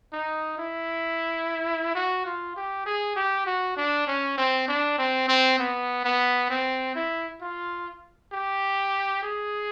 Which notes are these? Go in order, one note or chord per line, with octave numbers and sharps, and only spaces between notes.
D#4
E4
F#4
F4
G4
G#4
G4
F#4
D4
C#4
C4
D4
C4
C4
B3
B3
C4
E4
F4
G4
G#4